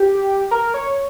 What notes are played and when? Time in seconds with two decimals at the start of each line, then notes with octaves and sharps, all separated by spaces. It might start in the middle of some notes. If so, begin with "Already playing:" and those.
Already playing: G4
0.51 A#4
0.74 C#5